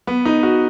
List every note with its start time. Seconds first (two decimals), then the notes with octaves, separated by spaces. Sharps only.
0.07 B3
0.25 D#4
0.43 F#4